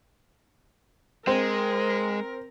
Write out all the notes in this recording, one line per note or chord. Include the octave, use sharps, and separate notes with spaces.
G#3 C4 A#4